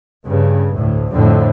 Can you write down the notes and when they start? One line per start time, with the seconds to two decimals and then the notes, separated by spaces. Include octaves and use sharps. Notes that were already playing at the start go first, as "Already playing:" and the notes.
0.24 G2 C#3
0.73 D2 A2
1.11 F2 A2 D3 C4